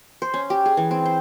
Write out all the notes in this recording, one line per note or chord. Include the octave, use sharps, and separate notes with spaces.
C5
C#4
G4
G#4
E3
C4
C5